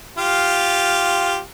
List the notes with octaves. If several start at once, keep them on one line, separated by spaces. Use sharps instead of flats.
F4 G4 F5